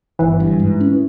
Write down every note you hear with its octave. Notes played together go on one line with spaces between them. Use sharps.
G1 E3
G2
G#2
C#4